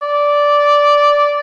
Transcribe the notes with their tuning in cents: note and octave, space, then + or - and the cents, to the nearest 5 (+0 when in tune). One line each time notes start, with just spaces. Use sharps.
D5 -10